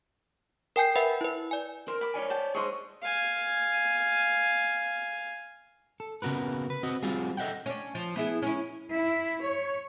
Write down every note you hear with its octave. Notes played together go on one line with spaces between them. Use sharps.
A#4 G5 G#5 G6 C7
B4 E5 F#5 B5
E4 B4
D5 G#5
A#4 C5
B5 D6
C#5 D5 G#5
G5 A5
G#4 C5 C#5 D#5 C6
F5 G#5
A4
C#3 B3 F#4 A#4 B4
B4
C4 F#4 D#5
G3 C4 F4 F#4 G#4
A4 D#5 E5 F#5 G5
C#4 D4
F3
B3 E4 G#4
C#4 E4
E4
C#5